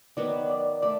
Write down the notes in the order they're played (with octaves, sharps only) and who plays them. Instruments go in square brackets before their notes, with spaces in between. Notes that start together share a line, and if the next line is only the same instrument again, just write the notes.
[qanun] D#3 F#3 B3 [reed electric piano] D5
[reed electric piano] D5
[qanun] A3 [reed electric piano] D5